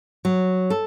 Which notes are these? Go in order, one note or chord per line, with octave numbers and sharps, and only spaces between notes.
F#3
A4